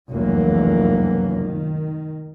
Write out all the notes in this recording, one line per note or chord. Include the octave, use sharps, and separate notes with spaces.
F1 C#2 F#2 E3 F#3 A#3
D#3